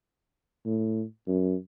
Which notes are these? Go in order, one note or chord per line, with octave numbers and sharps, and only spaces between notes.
A2
F#2